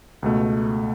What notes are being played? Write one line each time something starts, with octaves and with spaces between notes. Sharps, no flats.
C#2 B2 A3